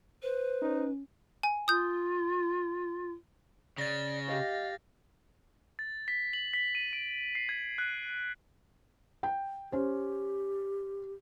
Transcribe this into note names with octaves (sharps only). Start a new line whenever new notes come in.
B4 C5
C#4 D#4
G#5
F4 D#6 G6
C#3 D5 A6 A#6
G4 D#5 F5
A6
B6
F#7
B6
D#7
D7
C7
G#6
F#6
G5
C#4 G4 C5